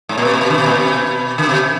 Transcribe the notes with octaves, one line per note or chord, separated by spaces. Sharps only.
G#2
A#2
B2
A#2
B2
D3
B2
A#2
B2
D3
B2